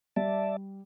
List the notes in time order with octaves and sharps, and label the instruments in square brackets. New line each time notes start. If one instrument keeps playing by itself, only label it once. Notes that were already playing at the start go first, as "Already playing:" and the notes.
[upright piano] G3 [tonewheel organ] D5 E5 A5